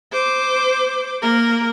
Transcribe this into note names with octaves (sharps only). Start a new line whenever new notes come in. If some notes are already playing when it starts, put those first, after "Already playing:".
C5 D6
A#3 A#4